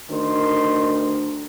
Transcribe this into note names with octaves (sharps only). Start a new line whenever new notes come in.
D2 D#3 C6